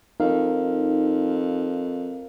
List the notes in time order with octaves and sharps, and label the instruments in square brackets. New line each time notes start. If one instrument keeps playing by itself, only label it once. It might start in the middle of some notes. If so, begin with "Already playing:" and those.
[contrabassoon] F2 [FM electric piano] D#4 [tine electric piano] A#4 F5